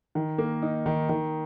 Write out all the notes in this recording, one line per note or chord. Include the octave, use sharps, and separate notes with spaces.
D#3
A#3
D#4
D#3
D#3